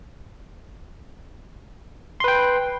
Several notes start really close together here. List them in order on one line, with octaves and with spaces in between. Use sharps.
C6 B4 G5